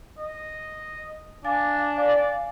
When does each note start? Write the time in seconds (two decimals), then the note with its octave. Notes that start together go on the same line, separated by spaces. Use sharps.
0.18 D#5
1.45 D4 F5 G#5 D6 A6
1.97 D5 F5